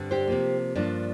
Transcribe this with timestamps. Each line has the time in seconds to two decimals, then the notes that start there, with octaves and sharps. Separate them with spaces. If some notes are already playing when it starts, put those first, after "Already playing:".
Already playing: G2 D3 G3 C4
0.11 G4 C5
0.28 C3 F3 A#3
0.75 G2 F3 A#3 D4